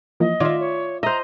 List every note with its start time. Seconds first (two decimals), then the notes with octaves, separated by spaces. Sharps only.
0.20 E3 F3 A#3 D#5
0.40 D#3 F4 D5 E5 G#6
0.60 C#5
1.03 C5 D#5 E5 A#5 F6